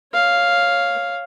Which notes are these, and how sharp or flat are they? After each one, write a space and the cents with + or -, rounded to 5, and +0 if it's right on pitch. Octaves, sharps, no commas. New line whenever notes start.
C#5 +0 F5 +0